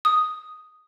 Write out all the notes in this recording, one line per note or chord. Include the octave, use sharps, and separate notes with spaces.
D#6